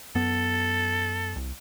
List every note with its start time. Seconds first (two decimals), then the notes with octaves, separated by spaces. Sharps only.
0.15 F#2 B3 A4
1.36 C2